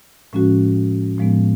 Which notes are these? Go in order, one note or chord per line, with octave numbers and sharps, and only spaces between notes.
A2 F3 G#3 C#4 F#4
A2 F3 G#3 B3